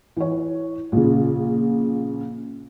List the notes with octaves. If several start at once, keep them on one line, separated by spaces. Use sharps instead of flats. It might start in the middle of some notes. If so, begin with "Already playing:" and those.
E3 C#5
A#1 C#3